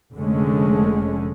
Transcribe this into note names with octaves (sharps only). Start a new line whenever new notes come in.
F1 D3 G#3 A3 C#4